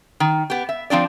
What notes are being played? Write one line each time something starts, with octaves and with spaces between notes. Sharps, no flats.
D#3
B3 G4
E5
F3 C4 D4 D5